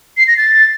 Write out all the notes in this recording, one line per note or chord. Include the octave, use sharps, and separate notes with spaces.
C7
A#6
A6